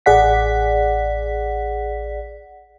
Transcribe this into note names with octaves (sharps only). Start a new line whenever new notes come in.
A1 G#4 D5 F#5 B6